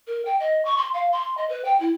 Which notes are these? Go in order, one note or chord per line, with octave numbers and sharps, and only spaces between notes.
A#4
G5
D#5
C#6
C6
F5
C6
D#5
B4
G5
E4